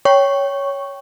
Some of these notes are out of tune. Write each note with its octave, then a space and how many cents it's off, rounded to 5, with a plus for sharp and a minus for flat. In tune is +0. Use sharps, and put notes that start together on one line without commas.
C#5 +5 G5 +0 C#6 +0